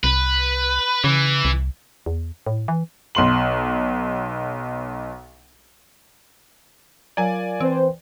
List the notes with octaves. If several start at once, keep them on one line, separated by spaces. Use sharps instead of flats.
C2 B4
C#3 E3
C2
E2
A2
E3
B1 C6 F#7
F#3 F4 A#4 D5 F5 G#5
E3 C4 B4 C5 G5